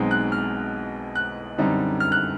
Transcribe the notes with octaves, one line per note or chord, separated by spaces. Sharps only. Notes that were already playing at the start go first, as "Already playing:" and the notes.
Already playing: B1 B2 G#3 C4 D#4
F#6
F6
F#6
F#2 D3 G3 C4 D#4
F6
F#6